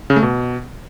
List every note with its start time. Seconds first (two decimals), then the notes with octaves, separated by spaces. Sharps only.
0.10 C#3
0.16 A3
0.23 B2